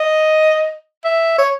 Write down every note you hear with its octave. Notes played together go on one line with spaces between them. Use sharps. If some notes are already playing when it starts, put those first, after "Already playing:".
Already playing: D#5
E5
C#5